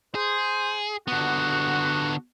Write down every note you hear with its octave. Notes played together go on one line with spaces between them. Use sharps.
G#4 C5
D3 B3 F#4